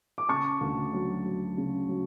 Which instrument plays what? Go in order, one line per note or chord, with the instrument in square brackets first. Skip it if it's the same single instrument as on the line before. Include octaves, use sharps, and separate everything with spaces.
[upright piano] D6
C#3 A5 C#6
D2
F#3
F#3
C#3
F#3